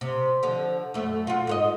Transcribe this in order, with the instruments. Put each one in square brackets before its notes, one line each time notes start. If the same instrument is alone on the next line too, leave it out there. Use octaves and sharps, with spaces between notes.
[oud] C3
D3 F3
F#2 A3
F4 F#4
G#2 A4 D#5